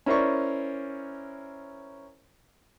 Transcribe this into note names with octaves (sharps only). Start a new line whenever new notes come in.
C#4 E4 A#4 C5 D5 C#6